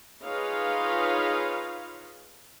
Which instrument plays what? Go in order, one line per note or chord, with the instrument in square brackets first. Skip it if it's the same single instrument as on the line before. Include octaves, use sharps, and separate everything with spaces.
[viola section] D#4 F4 G#4 B4 C#5 F5